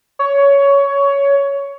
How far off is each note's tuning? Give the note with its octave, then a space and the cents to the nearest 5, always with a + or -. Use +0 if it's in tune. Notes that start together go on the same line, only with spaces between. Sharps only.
C#5 +15